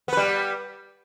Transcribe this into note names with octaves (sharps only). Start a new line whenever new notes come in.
G3 B3 B4